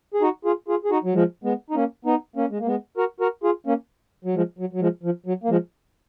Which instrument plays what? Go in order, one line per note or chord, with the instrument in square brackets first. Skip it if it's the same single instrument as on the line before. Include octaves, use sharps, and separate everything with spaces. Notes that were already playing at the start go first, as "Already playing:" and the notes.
[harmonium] G#4
D#4 F#4
F4 G#4
F4 G#4
G#4
D#4 F#4
F#3
F3 G#3
G#3 B3
D#4
A#3 C#4
B3 D#4
A#3 C#4
G#3
A#3
G#3 B3
F#4 A#4
F#4 A#4
F4 G#4
A#3 C#4
F#3
F3 G#3
F#3
F#3
F3 G#3
F3
F#3
A#3
F3 G#3